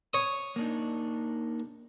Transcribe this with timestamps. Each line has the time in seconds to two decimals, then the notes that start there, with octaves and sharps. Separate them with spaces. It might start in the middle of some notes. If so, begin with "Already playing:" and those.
0.13 C#5 D#6
0.56 A#3 D4 D#4